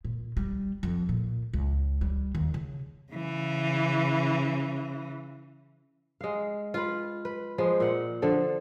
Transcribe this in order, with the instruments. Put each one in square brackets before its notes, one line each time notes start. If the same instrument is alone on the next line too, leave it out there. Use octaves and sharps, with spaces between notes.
[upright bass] A#2
G3
F2
A#2
C#2
G3
D#2
C#3
[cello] C#3 E3
[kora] G#3 F5
F4 B4
B4
F3 G#3
A#2 F#5
D3 F3 A4